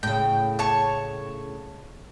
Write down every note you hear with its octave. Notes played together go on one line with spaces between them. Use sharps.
A2 C#3 G5
C#5 A5 C#6